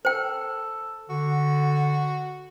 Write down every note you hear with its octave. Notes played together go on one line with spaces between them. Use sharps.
A4 C5 G5
D3 F#4